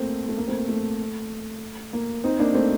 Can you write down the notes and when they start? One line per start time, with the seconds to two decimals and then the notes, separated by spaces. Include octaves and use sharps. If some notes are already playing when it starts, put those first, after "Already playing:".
Already playing: A3 A#3 C4
0.29 A3
0.38 A#3
0.48 A3 C4
0.58 A#3
0.69 A3
1.93 A#3
2.24 C4 D#4
2.39 A#3 D4
2.54 A3 C4